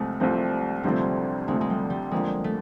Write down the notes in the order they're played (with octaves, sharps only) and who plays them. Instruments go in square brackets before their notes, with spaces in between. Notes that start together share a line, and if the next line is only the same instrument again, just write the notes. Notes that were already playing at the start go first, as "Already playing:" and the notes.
Already playing: [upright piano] C2 C3 F3 A3 C4 [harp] G#3
[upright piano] C2 C3 F3 A3 C4 [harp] G3
[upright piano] D2 C3 F3 A3 C4 [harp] G3
[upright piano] D2 C3 F3 A3 C4 [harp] G#3
[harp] G#3
G3
G3
[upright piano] F2 D3 F3 A#3 [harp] G#3
[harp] A3